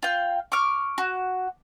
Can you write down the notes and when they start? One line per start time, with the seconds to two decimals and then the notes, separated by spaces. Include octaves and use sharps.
0.02 F4 F5 G5
0.52 C#6 D6 F6
0.98 F#4